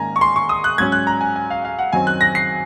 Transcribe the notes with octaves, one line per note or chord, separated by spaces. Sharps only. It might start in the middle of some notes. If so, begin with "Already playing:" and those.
Already playing: G#2 D#3 A#3 C#4 G#5 A#5
C#6
C6
C#6
D#6
F#6
G#2 F#3 C#4 G#6
F#6
A#5
G#5
G#5
F5
F5
F#5
F#2 D#3 F#3 C4 G#5
F#6
A#6
C7